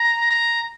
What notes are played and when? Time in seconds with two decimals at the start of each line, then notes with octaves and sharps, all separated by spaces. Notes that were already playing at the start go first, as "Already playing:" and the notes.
Already playing: A#5
0.31 A#5